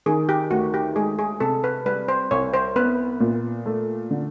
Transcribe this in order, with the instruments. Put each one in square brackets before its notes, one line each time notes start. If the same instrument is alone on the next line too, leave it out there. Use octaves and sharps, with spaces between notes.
[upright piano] D#3 [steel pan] G#4
[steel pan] G4
[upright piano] D2 [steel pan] F#4
[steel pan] G4
[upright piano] G#3 [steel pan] G#4
[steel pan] G#4
[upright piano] C3 [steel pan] A4
[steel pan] B4
[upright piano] G3 [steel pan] B4
[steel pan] C5
[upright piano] C2 [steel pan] C#5
[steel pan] C5
[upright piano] B3 [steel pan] B4
[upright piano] A#2
A3
D3